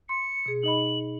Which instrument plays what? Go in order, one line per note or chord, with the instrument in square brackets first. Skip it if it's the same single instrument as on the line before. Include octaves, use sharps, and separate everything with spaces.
[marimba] C6 [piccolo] C#7
[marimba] B2 G#4
[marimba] D#4 D#5 B5 [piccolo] F#7